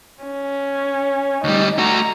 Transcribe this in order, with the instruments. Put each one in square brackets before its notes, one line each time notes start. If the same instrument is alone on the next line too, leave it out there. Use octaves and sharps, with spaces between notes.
[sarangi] C#4
[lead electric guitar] D2 G3 [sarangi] D#4
[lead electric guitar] A3 F#4 [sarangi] A#5